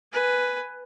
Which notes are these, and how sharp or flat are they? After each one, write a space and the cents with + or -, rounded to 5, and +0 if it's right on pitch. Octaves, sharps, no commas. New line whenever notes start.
B4 +5 G#5 +0